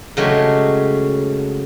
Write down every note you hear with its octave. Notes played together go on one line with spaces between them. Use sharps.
C#3 F#3 G#3 A3 G4 G#4